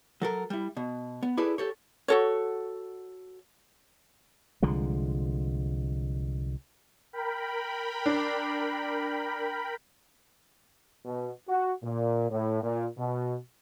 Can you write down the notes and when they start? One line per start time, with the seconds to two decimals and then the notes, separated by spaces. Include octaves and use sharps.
0.22 F#3 A4 A#4
0.50 G3 E4
0.77 B2
1.23 B3
1.37 E4 G#4 A4 B4 D5
1.58 G4 A4 C#5
2.08 F#4 A4 C#5
4.62 C2 D3 F3 G#3
7.13 A#4 G5 B5
8.06 D4
11.05 B2
11.48 F#4
11.83 A#2
12.30 A2
12.63 A#2
12.98 B2